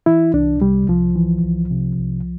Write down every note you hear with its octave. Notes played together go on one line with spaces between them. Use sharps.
E3 E4
C2 D4
C3 G3
C2 F3
E3
C2
C3
C2